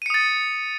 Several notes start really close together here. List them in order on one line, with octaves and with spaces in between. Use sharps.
D#7 C#7 D#6 A6